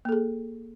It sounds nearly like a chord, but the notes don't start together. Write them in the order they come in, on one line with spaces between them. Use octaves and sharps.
A#3 A4 G#4